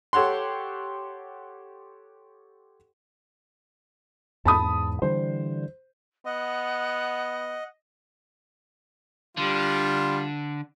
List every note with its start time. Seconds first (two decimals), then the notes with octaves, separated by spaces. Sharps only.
0.13 G4 A4 C#5 F#5 C6
4.45 E2 G#2 A5 B5 D#6
5.02 D3 E3 G3 C5
6.25 B3 D#5 F#5
9.37 D3 G3 F4